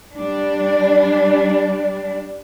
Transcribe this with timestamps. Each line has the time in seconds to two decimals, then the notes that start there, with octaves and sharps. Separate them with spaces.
0.14 G3 D4